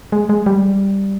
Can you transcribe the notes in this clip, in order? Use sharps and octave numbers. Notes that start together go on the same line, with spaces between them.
G#3
G#3
G3